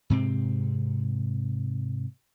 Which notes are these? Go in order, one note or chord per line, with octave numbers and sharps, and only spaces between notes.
G#2 C3 C4